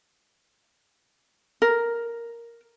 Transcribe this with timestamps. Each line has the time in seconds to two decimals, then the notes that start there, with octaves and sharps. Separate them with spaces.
1.62 A#4